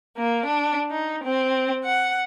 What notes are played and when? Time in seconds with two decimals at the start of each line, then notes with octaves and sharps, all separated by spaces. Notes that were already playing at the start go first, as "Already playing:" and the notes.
0.17 A#3
0.46 D4
0.91 D#4
1.23 C4
1.85 F#5